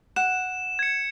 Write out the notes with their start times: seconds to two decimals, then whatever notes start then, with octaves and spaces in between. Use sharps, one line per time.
0.16 F#5 E7
0.79 G#6 C#7